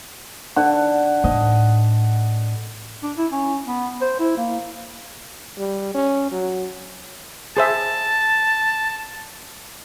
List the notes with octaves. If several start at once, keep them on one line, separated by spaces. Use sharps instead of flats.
D3 F#5
A2 D#5
D4
E4
C#4
B3
C5
E4
A#3
G3
C#4
F#3
G#4 C5 E5 A5